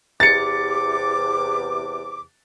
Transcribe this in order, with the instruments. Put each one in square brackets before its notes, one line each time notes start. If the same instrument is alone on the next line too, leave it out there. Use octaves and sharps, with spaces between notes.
[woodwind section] E2 C3 D6 [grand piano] A6 C#7